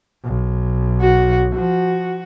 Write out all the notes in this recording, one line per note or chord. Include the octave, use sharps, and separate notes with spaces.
B1
F#4
F3 F#4